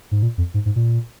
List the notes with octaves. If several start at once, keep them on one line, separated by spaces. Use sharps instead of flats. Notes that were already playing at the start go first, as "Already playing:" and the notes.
G#2
A#2
F2
G#2
G#2
A#2